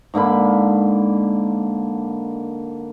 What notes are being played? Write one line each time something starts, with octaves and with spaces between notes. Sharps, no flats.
G#2 D3 A#3 B5